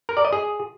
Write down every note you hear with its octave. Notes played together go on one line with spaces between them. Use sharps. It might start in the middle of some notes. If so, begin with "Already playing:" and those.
A#4
D5
D#5
G#4